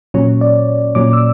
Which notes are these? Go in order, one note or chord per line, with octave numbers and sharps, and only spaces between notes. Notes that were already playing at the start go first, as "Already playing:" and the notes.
A#2 F#3 C#4 C#5
D5
A#2 F#3 C#4 D6
E6